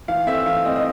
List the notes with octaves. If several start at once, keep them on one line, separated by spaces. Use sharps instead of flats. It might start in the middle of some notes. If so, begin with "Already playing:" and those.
E3 F5
A3 C4 E5
E3 F5
A3 C4 D#5
D#5